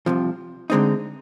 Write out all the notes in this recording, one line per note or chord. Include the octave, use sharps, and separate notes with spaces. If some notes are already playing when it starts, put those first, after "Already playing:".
C2 C3 F3
D2 D3 G#3 C4 D#4